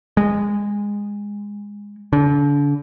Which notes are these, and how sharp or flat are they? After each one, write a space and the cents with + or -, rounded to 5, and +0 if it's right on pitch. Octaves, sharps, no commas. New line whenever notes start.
G#3 -20
D3 -35